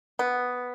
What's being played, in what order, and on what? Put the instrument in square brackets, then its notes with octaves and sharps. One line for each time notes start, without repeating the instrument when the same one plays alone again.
[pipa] B3